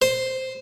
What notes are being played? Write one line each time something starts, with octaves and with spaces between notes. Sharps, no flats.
C5